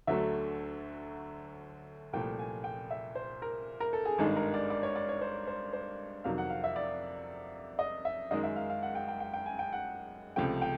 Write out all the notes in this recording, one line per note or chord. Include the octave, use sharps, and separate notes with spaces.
D2 D3 F#3 A3 E5
C2 A#2 F3 A3 G5
G#5
G5
E5
C5
A#4
A#4
A4
G#4
G#1 G2 D#3 G#3 A4
A#4
D5
D5
C#5
D5
C#5
C5
C5
C5
F2 C3 D#3 F#3 F5
F#5
F5
E5
D5
D#5
E5
F#2 D#3 G#3 D#5
E5
F5
F5
F#5
G5
G5
G5
G5
G#5
G5
F#5
C#2 C3 F3 A3 G5
G5